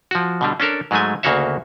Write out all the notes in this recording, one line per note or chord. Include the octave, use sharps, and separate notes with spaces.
F3 F#4
B2 D3 G3
C#4 D4 A4 A#4
G#2 F#3 G#3 A3 G#5
D2 C#3 A#3 F#4 C#5 E5